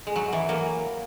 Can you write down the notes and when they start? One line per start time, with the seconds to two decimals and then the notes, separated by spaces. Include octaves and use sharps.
0.07 G#3
0.16 F#3
0.33 E3
0.49 F#3 A#3